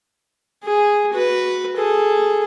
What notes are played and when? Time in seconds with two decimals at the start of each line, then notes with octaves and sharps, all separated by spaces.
0.64 G#4
1.14 F#4 B4
1.77 G#4 A4